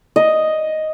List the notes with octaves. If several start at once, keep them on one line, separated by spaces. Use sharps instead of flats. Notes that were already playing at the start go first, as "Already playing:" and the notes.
D#5